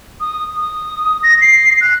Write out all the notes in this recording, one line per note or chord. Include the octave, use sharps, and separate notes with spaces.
D#6
D#6
A#6
C7
F#6